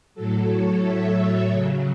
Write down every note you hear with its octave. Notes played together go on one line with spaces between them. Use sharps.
A2 F#3 A4
C#5
E5
C#3 F#3